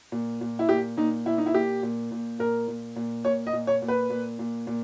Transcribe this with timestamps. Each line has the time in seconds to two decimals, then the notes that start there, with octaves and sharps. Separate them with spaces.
0.12 A#2
0.41 A#2
0.59 E4
0.69 A#2 G4
0.97 A#2 D#4
1.26 A#2 E4
1.38 D#4
1.46 E4
1.54 A#2 G4
1.83 A#2
2.12 A#2
2.39 A#2 A#4
2.68 A#2
2.96 A#2
3.25 A#2 C#5
3.47 D#5
3.53 A#2
3.67 C#5
3.82 A#2
3.88 B4
4.10 A#2
4.39 A#2
4.67 A#2